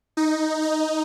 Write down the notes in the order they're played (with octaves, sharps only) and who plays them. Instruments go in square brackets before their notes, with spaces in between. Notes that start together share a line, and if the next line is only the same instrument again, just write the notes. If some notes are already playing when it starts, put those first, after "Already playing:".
[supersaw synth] D#4
D#4